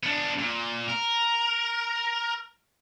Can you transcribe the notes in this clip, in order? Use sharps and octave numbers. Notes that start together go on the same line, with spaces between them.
B3 D4
A#2
A#4